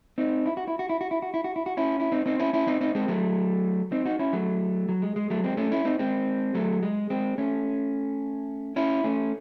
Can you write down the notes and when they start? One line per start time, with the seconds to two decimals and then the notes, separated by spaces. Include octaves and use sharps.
0.18 C4 D#4
0.46 E4
0.57 F#4
0.68 E4
0.79 F#4
0.89 E4
1.01 F#4
1.11 E4
1.22 F#4
1.34 E4
1.44 F#4
1.56 E4
1.66 F#4
1.77 C#4 E4
2.00 E4
2.12 C4 D#4
2.26 C4 D#4
2.39 C#4 E4
2.53 C#4 E4
2.67 C4 D#4
2.81 C4 D#4
2.95 G#3 C4
3.08 F#3 A3
3.92 C4 D#4
4.05 D#4 F#4
4.19 C#4 E4
4.33 F#3 A3
4.89 F#3
5.02 G#3
5.16 G#3
5.30 F#3 A3
5.44 G#3 C4
5.57 A3 C#4
5.71 C#4 E4
5.85 C4 D#4
5.99 G#3 C4
6.55 F#3 A3
6.83 G#3
7.10 G#3 C4
7.38 A3 C#4
8.76 C#4 E4
9.04 A3 C#4